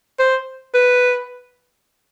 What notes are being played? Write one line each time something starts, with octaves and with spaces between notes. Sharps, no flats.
C5
B4